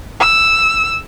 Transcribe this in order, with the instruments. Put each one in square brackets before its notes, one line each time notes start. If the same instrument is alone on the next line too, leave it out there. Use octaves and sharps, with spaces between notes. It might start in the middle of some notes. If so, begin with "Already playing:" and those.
[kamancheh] E6